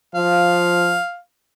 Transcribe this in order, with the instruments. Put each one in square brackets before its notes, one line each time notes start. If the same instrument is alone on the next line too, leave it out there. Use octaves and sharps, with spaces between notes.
[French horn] F3 [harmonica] F5